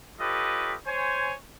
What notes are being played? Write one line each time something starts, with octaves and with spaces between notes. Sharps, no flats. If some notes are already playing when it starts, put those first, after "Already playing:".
F4 G4 A4 B4 C#5 D#5
C5 C#5 G#5